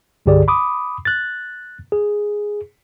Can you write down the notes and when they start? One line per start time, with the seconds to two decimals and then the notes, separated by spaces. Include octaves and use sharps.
0.26 C2 G2 D3 G4 G#4 D5
0.48 B5 D6 D#6
1.05 F#6 A6
1.92 G#4